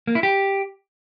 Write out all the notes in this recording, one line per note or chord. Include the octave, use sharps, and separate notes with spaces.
A#3
E4
G4